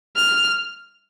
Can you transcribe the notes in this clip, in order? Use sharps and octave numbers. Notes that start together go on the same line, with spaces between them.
F6